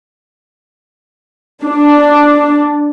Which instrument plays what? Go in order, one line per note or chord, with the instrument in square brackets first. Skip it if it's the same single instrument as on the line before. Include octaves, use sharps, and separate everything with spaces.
[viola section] D4